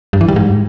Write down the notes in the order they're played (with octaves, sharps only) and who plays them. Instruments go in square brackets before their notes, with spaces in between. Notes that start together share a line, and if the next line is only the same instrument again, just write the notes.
[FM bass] G2
E3
G3
G#2